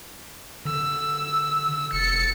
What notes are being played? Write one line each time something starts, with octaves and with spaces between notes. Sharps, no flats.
D3 E6
F1 A6 C#7